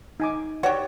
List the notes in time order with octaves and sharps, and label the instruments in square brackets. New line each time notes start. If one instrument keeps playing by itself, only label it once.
[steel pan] D#4 G#5 D6
[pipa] F#4 G4 [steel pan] B4 C#5 D5